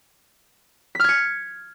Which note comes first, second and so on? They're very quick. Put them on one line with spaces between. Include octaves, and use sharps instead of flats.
B6 F6 G#6 C#7